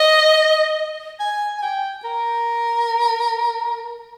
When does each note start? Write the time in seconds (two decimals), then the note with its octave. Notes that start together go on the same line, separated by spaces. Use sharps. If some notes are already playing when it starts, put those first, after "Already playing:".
Already playing: D#5
1.20 G#5
1.58 G#5
1.63 G5
2.05 A#4